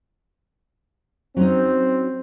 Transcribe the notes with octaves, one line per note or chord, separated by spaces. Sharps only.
F#3 C4 C#4 D#4